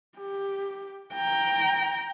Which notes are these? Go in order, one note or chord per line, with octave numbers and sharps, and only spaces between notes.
G4
G5 A#5